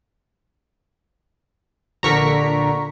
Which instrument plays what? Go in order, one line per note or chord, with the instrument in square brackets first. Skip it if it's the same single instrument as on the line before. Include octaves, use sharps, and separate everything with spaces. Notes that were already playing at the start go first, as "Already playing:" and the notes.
[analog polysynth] A#1 D3 A#4 [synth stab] A#5 C#6 B6